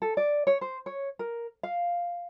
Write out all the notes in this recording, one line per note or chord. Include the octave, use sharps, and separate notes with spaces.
A4
D5
C#5
C5
C#5
A#4
F5